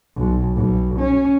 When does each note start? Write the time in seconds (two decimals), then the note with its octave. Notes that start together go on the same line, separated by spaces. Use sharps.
0.16 B1
0.56 B1
0.99 C#4